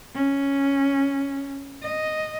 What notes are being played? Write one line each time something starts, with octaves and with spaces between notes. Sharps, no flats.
C#4
D#5